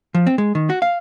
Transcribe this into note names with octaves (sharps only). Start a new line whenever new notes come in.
F3
C4
G#3
D#3
F#4
F5